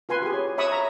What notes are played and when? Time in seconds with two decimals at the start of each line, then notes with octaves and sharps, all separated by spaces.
0.09 F4 B4 G#5 C6
0.22 G4 G#4
0.34 C#5
0.58 C#5 E5 B5 C#6 D#6 E6
0.72 A#5